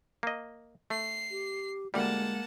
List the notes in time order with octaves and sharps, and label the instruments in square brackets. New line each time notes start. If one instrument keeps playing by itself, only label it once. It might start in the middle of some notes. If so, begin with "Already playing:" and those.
[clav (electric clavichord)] A#3 D#5
[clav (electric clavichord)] A3 [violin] C7
[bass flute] G4
[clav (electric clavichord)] D2 G3 [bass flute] G#3 [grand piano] A#3 [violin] F#5 A5